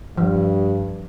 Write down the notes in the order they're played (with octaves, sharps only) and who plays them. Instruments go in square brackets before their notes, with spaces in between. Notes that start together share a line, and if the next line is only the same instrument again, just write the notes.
[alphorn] G2 [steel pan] F3